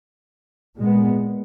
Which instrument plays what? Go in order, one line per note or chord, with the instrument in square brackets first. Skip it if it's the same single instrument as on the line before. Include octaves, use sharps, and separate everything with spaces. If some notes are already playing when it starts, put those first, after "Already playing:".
[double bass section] A#2 G#3 B3